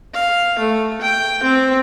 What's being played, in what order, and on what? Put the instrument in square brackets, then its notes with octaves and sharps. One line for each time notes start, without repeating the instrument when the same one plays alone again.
[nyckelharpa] F5
A3
G5
C4